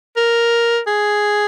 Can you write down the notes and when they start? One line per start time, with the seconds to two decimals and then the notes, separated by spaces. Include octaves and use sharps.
0.17 A#4
0.87 G#4